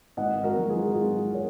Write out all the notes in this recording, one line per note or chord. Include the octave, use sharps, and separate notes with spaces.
G#1 D#5 F#5
F#4 A#4
G#2 F#3
F4 G#4
G#1 F4
A#4 C#5